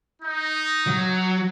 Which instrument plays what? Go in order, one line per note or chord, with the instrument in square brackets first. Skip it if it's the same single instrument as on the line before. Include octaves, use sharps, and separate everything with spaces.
[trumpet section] D#4
[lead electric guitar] F#3